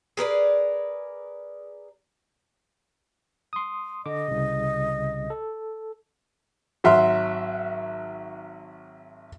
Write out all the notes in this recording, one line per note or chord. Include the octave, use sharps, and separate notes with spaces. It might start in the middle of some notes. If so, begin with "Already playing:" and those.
G#4 A#4 B4 D5
C6 D#6
D3 D#5 D6
C2 C#3
A4
G#1 F#3 F#4 E5 C6 F6